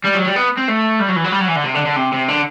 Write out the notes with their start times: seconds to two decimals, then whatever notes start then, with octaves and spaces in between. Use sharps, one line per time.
0.04 G3
0.15 F#3
0.26 G3
0.36 B3
0.58 C4
0.68 A3
1.00 G3
1.08 F#3
1.16 E3
1.24 F#3
1.32 G3
1.41 F#3
1.48 E3
1.56 D3
1.64 C3
1.75 D3
1.86 D3
1.96 C3
2.12 C3
2.28 D3